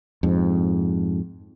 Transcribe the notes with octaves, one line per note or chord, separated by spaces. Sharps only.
F2 G#2